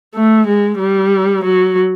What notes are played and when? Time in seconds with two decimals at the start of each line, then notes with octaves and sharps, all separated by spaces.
0.14 A3
0.47 G#3
0.79 G3
1.44 F#3